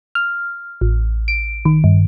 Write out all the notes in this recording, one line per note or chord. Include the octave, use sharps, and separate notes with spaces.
F6
A1
D7
D#3
G2